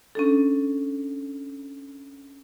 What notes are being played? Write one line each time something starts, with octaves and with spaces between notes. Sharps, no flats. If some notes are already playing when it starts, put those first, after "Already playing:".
C#4 D4 A4